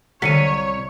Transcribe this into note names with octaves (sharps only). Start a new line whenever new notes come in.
C2 D3 F#3 C#4 C#5 B6 C#7 D#7